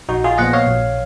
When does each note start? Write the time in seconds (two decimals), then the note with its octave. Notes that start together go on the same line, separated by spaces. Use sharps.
0.09 A#1 D#4 F#4
0.24 F4 G#4
0.38 A#2 F3 B3 D#5 F#5
0.53 C#5 F5
0.67 A#1